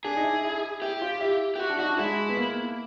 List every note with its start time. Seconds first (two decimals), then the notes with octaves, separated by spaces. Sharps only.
0.05 D4 G#4
0.17 D#4
0.23 E4
0.44 E4
0.82 E4 G4
1.02 F4
1.21 E4
1.56 G4
1.59 E4 F#4
1.69 D4
1.79 D#4 F#4
1.89 D4
1.98 G#3 E4
2.29 B3
2.37 A#3